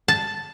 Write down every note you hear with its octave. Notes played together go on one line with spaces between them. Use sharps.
A5